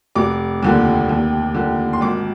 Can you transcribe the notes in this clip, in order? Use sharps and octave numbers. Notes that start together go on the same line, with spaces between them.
F1 D6
D#2 D3 F3
D#2
D3 F3
C6
G#1 D6